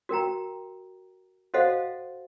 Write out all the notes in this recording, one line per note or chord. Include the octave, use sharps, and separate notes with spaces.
F#4 A#4 G5 A#5
F#4 A4 C5 D#5 F5 F#5